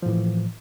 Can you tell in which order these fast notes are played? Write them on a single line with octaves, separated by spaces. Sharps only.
F3 A2 E3